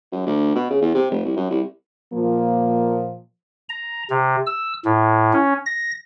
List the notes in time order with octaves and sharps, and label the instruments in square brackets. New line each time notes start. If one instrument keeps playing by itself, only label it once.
[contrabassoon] F#2
D2
B2
C#3
E2
C3
F1
C2
F#2
C2
[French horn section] A#2 F3 A#3
[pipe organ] A#5
C3
E6
A2
C#4
A#6